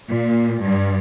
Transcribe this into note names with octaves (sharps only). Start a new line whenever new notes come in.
A#2
G2